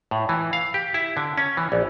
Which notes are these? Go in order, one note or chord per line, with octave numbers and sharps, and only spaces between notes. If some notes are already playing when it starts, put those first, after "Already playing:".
A2
E3
F5
G4
E4
D3
C#4
E3
A#1